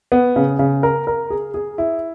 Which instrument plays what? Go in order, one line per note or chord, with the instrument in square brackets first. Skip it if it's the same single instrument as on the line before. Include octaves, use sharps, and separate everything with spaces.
[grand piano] B3
C#3
C#3
A#4
A#4
G#4
G#4
E4